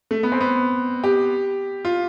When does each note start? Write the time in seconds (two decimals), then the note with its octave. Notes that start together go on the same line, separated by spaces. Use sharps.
0.11 A3
0.23 B3
0.32 C4
0.41 B3
1.04 G4
1.85 F4